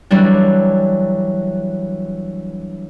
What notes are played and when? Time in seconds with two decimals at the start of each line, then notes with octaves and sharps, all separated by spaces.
0.11 E3 F#3 G3 D4